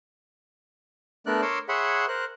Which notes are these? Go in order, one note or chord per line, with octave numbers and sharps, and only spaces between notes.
A3 B3 D4 A#4 D5 F#6
A#4 C#5 C6 D6 E6
G#4 C#5 E5 F#5 B5 C6
A#4 C5 F#6